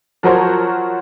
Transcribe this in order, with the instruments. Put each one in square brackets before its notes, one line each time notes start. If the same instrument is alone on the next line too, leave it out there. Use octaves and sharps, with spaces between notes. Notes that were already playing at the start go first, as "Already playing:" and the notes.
[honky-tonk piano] F3 F#3 F#4 A#4 C5 C#5